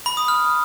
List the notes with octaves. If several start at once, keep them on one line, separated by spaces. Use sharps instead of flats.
B5
D#6
F6